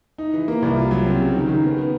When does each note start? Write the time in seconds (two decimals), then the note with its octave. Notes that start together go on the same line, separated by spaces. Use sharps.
0.18 D#4
0.33 E3
0.48 A#3
0.63 C2
0.77 F4
0.91 F#3
1.06 C4
1.20 C#3
1.35 D#3
1.49 D#3
1.64 B3